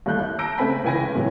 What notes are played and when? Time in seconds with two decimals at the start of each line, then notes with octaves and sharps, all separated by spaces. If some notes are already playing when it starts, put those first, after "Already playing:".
0.06 D#2 G3 A3 F#6 G6
0.20 E4
0.39 A5 A#5 E6 G6 A#6 D7
0.58 C#3 A3 C4 G#5 B5 B6
0.84 C#2 E3 G5 G#5 B5 A#6
1.15 A2 E3 F#3